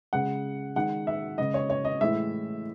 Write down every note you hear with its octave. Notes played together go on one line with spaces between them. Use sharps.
C#3 G#3 F#5
D#3 G#3 F#5
E5
C#3 G#3 D#5
C#5
C#5
D#5
A2 E3 G#3 E5